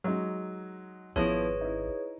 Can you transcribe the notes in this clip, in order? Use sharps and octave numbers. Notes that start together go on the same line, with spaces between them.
F#3 G#3 D#4
G#1 F3 B3 E4 G#4 B4 C#5
D#4 E4